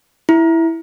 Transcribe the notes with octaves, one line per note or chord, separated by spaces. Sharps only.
E4